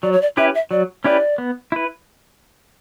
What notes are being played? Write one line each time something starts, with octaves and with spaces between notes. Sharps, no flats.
F#3 D5
C#5
D5
C#4 E4 G4 B4 E5
E5
F#3 D5
C#4 E4 G4 B4 D5
B3
E4 B4